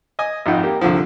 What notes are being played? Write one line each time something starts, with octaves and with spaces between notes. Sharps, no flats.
D#5 G#5 D#6
G#1 F2 D#4 F4 F#5 G5
A#3 G4
C2 D3 F3